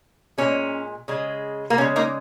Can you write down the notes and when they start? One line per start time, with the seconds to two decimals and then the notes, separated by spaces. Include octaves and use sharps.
0.38 A#2 G#3 C#4
1.08 C#3 G#3
1.70 A#3
1.78 C#3 C#4
1.81 G#3
1.96 A#3 D#4